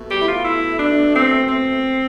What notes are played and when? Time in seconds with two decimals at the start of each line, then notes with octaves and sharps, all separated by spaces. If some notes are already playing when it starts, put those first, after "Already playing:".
Already playing: B2 A3
0.10 G4
0.22 E4
0.27 F4
0.44 E4
0.79 D4
1.13 C4
1.47 C4